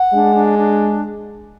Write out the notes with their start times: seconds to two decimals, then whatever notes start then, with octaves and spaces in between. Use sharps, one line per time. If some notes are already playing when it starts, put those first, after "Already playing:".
Already playing: F#5
0.13 G#3 D4
0.35 D4
0.58 D4